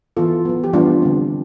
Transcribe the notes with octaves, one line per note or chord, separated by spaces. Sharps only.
E3 B3 F4 A4
F3 B3
G4
E3 G3 B3 D4 F4
D3 G3 C4